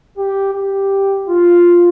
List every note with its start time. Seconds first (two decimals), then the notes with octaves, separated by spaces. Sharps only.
0.16 G4
0.54 G4
1.27 F4